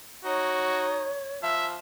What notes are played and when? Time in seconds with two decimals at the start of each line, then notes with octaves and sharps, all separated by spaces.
0.25 D#4 F#4 C#5
1.43 F3 E5